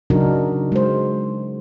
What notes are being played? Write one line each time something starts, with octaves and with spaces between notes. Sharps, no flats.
C#3 F#3 D4 D#4 F#4 A#4
G#3 C5